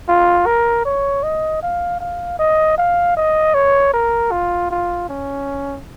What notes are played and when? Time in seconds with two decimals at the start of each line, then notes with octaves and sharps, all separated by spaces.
0.08 F4
0.46 A#4
0.85 C#5
1.23 D#5
1.63 F5
2.00 F5
2.39 D#5
2.78 F5
3.17 D#5
3.54 C#5
3.94 A#4
4.31 F4
4.70 F4
5.09 C#4